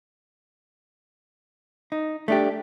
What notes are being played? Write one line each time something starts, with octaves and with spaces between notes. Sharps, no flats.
D#4
A3 D4 G4